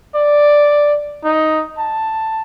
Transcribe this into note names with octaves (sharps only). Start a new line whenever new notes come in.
D5
D#4
A5